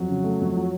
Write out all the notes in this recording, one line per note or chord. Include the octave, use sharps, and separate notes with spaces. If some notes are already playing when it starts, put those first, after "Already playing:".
Already playing: F2 F#3
C#3
A3
F2
F3